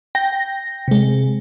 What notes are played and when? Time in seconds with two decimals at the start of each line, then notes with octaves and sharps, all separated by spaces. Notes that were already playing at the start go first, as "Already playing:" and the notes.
0.15 G5 A#6
0.88 C3 G#3